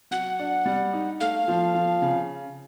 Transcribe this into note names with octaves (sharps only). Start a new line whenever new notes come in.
F#3 F#5
D4
G3
D#4
A3 F5
F3
F3
C#3